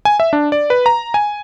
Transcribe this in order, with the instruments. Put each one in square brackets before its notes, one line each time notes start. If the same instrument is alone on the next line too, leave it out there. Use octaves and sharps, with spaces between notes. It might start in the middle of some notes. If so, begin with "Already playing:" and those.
[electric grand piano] G#5
E5
D4
D5
B4
A#5
G#5